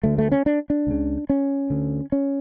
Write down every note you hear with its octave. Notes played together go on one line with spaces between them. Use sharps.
D2 D3 A3
A3
C#4
D4
D4
C#2 C#3
C#4
D2 D3
C#4